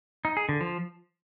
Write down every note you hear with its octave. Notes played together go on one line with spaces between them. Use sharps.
D#4
G#4
D3
F3